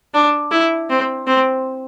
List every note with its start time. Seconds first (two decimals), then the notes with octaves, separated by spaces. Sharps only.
0.14 D4
0.51 E4
0.90 C4
1.27 C4